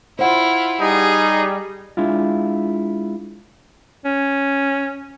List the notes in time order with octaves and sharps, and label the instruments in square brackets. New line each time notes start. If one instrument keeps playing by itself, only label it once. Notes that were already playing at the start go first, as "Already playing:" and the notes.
[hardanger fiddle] E4 F4 [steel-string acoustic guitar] C5 F#5
[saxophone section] G3 [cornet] D#4 [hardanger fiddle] G#4
[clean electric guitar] G#3 D4 E4 F4
[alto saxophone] C#4